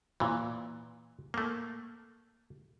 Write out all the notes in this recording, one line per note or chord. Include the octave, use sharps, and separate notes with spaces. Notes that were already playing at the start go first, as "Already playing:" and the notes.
A#2 E3
A3 A#3